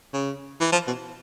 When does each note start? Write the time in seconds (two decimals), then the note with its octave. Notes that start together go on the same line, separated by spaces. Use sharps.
0.13 C#3
0.61 E3
0.72 F3
0.87 B2